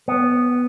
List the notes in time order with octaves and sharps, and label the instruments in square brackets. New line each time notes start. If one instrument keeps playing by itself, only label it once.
[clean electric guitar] B3